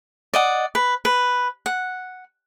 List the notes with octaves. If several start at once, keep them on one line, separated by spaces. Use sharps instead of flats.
D5 D#5 F#5
B4
B4
F#5